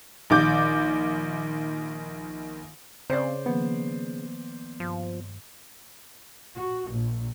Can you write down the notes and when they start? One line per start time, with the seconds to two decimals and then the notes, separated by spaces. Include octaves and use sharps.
0.30 A#1 D#3 D6 G6
3.10 C#3 C4 C5 D5
3.46 D#3 F3 A#3 B3
4.80 G2 F3
6.55 F#4
6.92 A#1